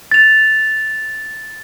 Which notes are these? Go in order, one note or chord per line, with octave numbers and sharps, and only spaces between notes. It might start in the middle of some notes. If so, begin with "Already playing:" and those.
A6 F7